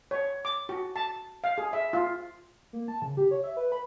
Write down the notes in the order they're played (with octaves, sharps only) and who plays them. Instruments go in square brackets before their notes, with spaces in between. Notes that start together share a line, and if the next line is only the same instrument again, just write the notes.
[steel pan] C#5
D6
F#4
A5
F5
G#4
E5
F4
[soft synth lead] A#3
A5
C#3
G4
C#5
E5
B4
B5